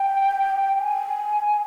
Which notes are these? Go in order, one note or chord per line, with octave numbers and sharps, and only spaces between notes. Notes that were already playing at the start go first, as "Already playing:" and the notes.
Already playing: G5
G#5